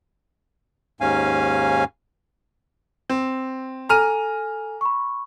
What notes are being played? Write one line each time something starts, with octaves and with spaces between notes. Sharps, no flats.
D#2 G#2 C#4 F5 G#5
C4
A4 G#5 A#5 F6 D#7
B5 C#6